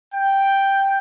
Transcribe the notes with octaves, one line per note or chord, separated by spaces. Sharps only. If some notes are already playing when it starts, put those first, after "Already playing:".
G5